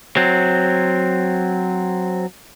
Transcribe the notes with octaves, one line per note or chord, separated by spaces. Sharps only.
F#3 C4